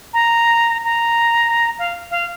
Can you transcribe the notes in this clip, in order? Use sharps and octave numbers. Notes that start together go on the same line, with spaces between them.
A#5
A#5
F5
F5